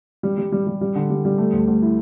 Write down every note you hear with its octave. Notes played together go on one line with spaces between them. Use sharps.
G3
G3
G3
G3
G3
D3
G3
G3
A3
D2
D2
E4